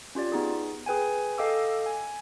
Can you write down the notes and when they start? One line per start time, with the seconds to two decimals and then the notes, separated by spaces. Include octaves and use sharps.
0.15 C#4 F4 G4 D5
0.32 B3 D#4 G#4
0.86 G#4 B4 G5 G#5
1.38 A4 D#5 F5 G5 D6 E6
1.86 G#5